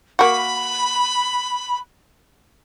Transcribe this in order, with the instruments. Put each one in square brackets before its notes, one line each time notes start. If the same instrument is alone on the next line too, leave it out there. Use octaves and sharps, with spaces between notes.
[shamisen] A#3 F#4 [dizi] B5